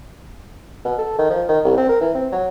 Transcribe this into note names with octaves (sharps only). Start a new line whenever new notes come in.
B2
A4
D#3
F3
D#3
C2
C4
A#4
E3
C4
F#3